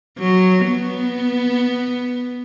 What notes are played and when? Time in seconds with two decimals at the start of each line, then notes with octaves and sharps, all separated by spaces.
0.18 F#3
0.67 B3